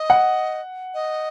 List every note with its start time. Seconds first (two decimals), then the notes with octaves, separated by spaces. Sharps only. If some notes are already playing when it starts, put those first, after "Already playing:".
Already playing: D#5
0.10 F#5
0.94 D#5